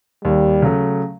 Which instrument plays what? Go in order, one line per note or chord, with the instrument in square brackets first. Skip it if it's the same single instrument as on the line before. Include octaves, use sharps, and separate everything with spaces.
[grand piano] D#2 [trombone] G3
[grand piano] C#3 F#3 A3